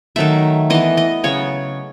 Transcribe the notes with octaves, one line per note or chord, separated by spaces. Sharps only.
D#3 F#3 A3 E5
E3 B3 D#5
D#5
C#3 F#3 B3 C#5